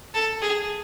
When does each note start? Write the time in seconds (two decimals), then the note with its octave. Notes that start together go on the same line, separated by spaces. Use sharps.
0.14 A4
0.42 G#4